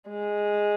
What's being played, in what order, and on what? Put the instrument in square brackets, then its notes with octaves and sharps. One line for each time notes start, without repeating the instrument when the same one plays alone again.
[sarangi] G#3